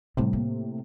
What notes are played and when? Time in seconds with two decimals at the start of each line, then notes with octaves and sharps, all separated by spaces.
0.17 A2 C3 G3 C4
0.33 A#3